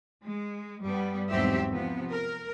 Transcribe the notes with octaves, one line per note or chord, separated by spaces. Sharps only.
G#3
G2 G3 B3
E2 G#2 F#3 C4 G4 E5
C3 F3 B3
A#4